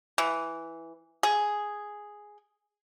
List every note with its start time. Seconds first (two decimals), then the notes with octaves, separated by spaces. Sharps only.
0.18 E3
1.23 G#4